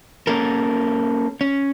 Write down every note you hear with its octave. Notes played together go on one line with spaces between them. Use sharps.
A#3 C#4 A4 A#4
C#4